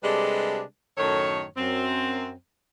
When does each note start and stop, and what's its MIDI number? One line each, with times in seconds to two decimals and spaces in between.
0.03 0.62 48
0.03 0.62 55
0.03 0.62 56
0.03 0.62 62
0.03 0.62 69
0.03 0.62 71
0.98 1.45 42
0.98 1.45 45
0.98 1.45 51
0.98 1.45 69
0.98 1.45 73
1.57 2.33 42
1.57 2.33 60